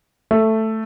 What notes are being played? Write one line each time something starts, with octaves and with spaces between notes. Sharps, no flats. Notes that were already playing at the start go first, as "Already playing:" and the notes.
A3